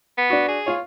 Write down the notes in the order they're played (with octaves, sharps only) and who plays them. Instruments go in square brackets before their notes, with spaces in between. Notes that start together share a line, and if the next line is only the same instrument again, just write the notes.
[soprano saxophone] B3
[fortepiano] D4 F#4
[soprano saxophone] G#4
[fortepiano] F4 C#5